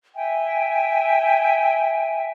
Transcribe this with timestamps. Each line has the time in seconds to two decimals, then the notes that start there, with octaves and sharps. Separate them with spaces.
0.15 E5 G5 G#5